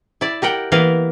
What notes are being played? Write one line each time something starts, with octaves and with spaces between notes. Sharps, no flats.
E4 D5
G4 A#4 F#5 G5
E3 A#3 B3 A#4 F5